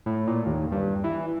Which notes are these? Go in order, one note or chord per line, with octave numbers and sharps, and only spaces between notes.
A2
A#2
D#2
G2
E3